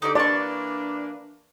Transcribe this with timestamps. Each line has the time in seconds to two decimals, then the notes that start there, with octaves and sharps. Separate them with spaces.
0.02 D3 D#4 G4 D5
0.15 E3 A#3 D4 D5 C6 C#6